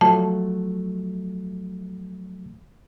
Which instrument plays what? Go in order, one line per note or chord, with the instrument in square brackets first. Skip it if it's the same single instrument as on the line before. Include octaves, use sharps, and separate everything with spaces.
[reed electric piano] F3 F#3 A3 [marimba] A5